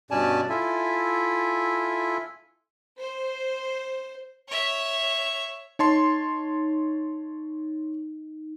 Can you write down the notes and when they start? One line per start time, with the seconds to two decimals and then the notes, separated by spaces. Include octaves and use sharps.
0.11 G2 B2 C#4 D5 G#5 A5
0.49 E4 F4 A4 E5 G#5
2.99 C5
4.48 C#5 E5
5.79 D#4 C#5 A5 C6